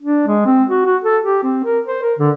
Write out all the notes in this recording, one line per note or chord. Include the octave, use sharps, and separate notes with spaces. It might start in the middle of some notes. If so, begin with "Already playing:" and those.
D4
G#3
C4
F#4
F#4
A4
G4
C4
A#4
C5
A#4
D3